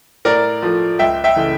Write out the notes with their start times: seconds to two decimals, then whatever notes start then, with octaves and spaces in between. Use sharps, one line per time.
0.25 A2 A#4 D5
0.63 F3 A3
0.99 C#2 E5 G5
1.24 E5 G5
1.36 C#3 E3 A3